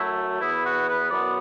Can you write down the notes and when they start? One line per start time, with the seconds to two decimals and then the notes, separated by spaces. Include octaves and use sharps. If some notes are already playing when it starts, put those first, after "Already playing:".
Already playing: F#2 F#3 A3 E4
0.41 E2 E3 B3 E4
0.63 F#4
0.87 B4
1.10 F#2 F#3 B3 D5